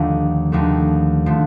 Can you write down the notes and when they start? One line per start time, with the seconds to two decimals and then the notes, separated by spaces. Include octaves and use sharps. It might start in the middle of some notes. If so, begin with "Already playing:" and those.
Already playing: D#2 D3 F3 A3
0.52 D#2 D3 F3 A3
1.26 D3 F3 A3